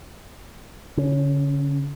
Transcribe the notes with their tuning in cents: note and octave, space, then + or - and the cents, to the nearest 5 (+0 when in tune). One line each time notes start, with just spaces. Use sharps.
D3 -45 C#4 +0